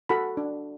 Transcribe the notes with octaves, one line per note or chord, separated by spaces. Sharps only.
F#4 A4 B5
D4